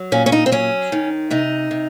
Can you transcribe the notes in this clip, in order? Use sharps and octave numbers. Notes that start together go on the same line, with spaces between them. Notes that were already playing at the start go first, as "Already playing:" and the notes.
Already playing: F#3
A#2 C#4
C#4
D#4
C4
F#3 C#4
D#3
C3 D#4
C3